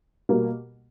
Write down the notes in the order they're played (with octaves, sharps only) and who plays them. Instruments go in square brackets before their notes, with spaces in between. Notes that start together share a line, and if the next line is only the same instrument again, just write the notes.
[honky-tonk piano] B2 G3 A#3